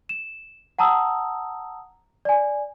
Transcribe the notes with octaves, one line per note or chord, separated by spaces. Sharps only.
E7
F#5 A5 A#5 D#6 E6
D5 G#5